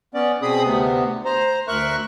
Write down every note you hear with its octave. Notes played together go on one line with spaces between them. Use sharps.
B3 C#4 D5
B2 C4 G#4 B5 D#6
D2 C3 B3
C5 A#5
D2 A#4 E5 C#6 F#6